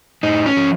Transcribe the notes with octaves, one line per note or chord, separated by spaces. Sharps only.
A2 D#4
C#4
F3